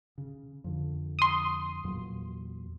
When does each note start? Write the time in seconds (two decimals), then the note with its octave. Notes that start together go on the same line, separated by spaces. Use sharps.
0.18 C#3
0.64 F2 D3
1.19 C6 D#6
1.84 E2 A#2 F#3